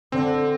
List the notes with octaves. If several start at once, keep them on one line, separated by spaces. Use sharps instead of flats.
D3 C4